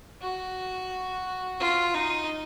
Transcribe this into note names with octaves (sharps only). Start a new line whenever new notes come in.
F#4
F4
D#4